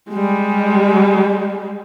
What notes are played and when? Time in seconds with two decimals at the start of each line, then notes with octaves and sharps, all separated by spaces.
0.11 G3 G#3